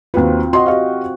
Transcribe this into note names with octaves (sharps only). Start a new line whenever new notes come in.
D#2 C4 F4 F#4 B4
F#4 D#5 C6
G4 D#5 F5